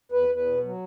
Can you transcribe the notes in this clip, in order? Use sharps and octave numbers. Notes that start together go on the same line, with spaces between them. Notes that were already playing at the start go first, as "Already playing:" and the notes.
E2 B4
E2
B4
B2
F#3